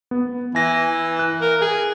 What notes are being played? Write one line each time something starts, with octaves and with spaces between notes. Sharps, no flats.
B3
E3 G#5 A#6
F#6
A#4
G#4 G#5